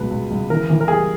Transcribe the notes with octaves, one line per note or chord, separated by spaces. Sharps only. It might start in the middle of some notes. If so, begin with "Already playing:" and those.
Already playing: C#2 B2 B4
C#2
C#2
E3 A#4
E3
A#4
G3 G#4